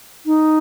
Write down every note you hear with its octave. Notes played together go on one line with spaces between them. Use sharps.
D#4